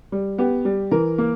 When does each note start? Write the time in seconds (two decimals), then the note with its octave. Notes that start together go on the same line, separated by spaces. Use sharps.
0.12 G3
0.38 B3 G4
0.65 G3
0.91 E3 A#4
1.18 A#3